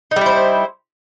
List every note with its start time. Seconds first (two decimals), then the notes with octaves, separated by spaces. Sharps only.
0.11 D#4
0.16 G3
0.21 E4
0.26 C5